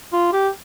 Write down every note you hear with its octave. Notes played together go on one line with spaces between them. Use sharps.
F4
G4